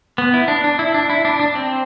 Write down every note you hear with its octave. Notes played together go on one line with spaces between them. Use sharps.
B3
E4
D4
D4
E4
D4
E4
D4
D4
C4